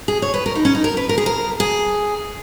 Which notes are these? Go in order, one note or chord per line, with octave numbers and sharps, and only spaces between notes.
G#4
C#5
B4
A#4
D#4
C#4
D#4
A#4
B4
A#4
G#4
A#4
G#4